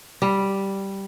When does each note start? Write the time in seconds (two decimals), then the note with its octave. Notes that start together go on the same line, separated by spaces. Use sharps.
0.22 G3